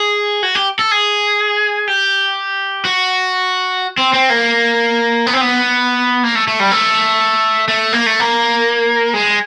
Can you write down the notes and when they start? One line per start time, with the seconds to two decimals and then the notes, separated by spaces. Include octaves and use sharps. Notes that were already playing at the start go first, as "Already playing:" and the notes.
Already playing: G#4
0.43 F#4
0.55 G4
0.79 A4
0.91 G#4
1.88 G4
2.85 F#4
3.98 C4
4.14 C4
4.30 A#3
5.27 B3
5.34 C4
5.41 B3
6.24 A#3
6.35 A3
6.48 A3
6.60 G3
6.71 A3
7.68 A3
7.93 A#3
8.06 A3
8.20 A#3
9.14 G#3